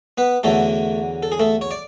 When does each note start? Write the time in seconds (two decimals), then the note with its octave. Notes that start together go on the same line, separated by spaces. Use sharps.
0.18 B3 B4
0.43 E2 D3 F#3 A3 A4
1.23 A4
1.32 G#4
1.40 A3 A4
1.61 C#5
1.71 D5